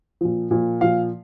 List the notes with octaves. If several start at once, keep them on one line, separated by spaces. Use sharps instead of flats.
A#2 F3
A#2 F3
A#2 F3 F5